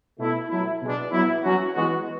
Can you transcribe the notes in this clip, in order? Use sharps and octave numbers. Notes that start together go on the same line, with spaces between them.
B2 A3 E4
F#3 A3 E4
B2 G#3 B3 D4
F#3 B3 E4
F#3 C#4 F#4
E3 G#3 B3 F#4